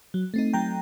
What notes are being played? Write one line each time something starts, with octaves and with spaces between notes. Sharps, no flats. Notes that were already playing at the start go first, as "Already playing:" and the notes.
F#3
A3 C4 D#4
F#3 G5 A#5